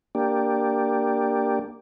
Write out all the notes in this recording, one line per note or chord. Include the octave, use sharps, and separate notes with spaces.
A#3 D4 G4